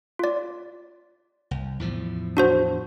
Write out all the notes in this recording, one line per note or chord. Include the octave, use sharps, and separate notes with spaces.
F4 D5
C2
E2 A2 F3
D4 F#4 C5